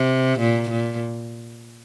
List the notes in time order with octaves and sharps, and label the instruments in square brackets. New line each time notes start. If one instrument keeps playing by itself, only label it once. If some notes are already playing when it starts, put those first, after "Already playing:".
Already playing: [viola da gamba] C3
A#2
A#2